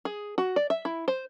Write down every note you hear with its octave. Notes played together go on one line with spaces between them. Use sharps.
G#4
F#4
D5
E5
E4
C5